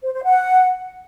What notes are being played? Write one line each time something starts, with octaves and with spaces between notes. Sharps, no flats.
C5
C5
F#5